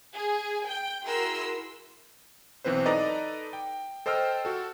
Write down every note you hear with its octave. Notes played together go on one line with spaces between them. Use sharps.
G#4
G5
E4 F#4 G#4 A#4 C6 E6
B1 E3 C4 B4 C5
D#4 A4 B4 D5 D#5 A#5
G5
A4 C5 D#5 G5 E6 F6
F#4 A4